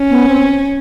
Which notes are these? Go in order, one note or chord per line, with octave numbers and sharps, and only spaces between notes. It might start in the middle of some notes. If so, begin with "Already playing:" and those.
Already playing: C#4
B3
C4